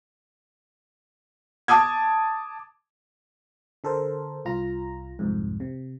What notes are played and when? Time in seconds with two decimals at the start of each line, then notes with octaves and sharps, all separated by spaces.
1.68 A5 D6 D#6 G#6
3.84 D3 A4 A#4 C5
4.45 C2 F4 A#5
5.19 C2 F2 G#2
5.60 C3